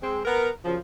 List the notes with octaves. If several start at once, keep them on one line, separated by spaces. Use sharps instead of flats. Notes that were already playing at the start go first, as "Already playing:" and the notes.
G#3 C4
B3 A#4
F#2 C#3 F3